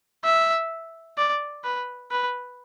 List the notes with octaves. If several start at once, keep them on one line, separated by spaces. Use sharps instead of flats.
E5
D5
B4
B4